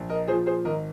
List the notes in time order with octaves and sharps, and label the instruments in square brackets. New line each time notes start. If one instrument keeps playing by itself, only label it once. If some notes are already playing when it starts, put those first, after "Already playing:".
Already playing: [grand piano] A#1
A#4 D#5
A#2 G#4 C5
F3
G#4 C5
G#1 A#4 D#5